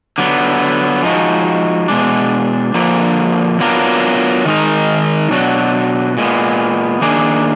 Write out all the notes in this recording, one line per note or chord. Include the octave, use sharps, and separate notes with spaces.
D3 F#3 B3
F3 G#3 D#4 F#4
B2 G#3 D4
D3 F3 A#3
F#3 B3 D4 F4 A#4
D#3 G#3 D#4 A#4
B2 F#3 D4 F#4
A#2 G#3 B3
D#3 A#3 D4 G#4